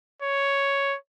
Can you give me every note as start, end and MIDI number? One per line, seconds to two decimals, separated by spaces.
0.22 0.97 73